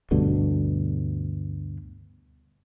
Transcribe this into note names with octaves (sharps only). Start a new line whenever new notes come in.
D2 G2 B2 D3